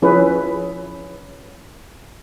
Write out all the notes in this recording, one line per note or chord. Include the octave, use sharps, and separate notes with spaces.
F3 C#4 E4 G#4 B4